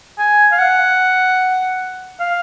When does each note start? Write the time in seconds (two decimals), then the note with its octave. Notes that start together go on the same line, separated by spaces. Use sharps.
0.18 G#5
0.52 F5
0.59 F#5
2.20 F5